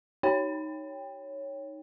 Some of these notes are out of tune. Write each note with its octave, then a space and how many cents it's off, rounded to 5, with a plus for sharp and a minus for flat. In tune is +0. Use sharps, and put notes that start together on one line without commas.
D#4 +0 C#5 +0 G5 +15